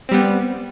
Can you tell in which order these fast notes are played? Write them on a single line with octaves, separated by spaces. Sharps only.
C4 G3 B3